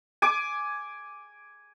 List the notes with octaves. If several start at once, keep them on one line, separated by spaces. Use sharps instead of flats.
G#5 D6